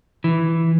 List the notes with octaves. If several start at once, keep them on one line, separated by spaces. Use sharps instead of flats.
E3